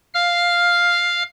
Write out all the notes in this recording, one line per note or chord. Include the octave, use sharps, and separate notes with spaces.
F5 F6